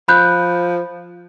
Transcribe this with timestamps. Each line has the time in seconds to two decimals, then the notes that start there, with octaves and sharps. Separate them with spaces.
0.08 F3 B5 F#6 G6